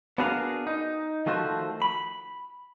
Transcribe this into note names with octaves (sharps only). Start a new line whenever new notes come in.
B3 D4 F#4 G#4 A#4 F5
D#4
D#3 F3 A3 F#4 C5
B5